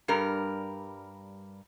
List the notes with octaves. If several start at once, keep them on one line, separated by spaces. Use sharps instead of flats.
G2 G3 A#4